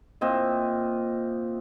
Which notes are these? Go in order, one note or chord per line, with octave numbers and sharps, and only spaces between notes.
A#2 C4 D#5 E5